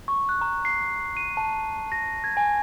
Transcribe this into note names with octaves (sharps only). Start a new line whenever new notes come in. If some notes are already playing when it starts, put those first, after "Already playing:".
C#6
F#6
A#5
C7
D#7
A5
A#6
G#6
G#5